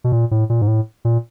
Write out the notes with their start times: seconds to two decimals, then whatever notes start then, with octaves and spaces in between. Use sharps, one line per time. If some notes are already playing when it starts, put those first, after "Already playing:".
0.04 B2
0.12 A#2
0.31 A2
0.50 A#2
0.62 G#2
0.68 A2
1.05 A#2